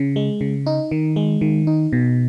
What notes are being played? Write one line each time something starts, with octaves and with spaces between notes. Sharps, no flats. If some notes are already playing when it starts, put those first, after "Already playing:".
Already playing: C#3
G#3
C#3
D#4
D#3
G#3
D#3
D#4
B2